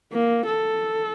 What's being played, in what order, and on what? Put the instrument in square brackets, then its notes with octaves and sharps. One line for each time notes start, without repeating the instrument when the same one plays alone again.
[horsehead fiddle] A#3
A4